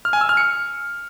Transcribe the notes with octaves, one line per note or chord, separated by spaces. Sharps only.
F6
G#5
E6
F6
C#7